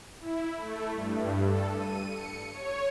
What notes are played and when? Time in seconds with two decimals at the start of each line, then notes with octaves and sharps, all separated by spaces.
0.20 E4
0.57 A3
0.92 G2
1.42 A4
1.75 D#7
2.08 C#7
2.52 C#5